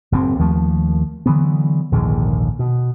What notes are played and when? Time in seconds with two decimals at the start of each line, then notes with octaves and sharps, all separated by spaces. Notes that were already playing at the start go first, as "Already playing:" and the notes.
0.12 F#1 A2 C4
0.39 D#2 F3 A3
1.26 D3 E3 F#3 B3
1.92 A#1 D#2 G#2 D3
2.59 B2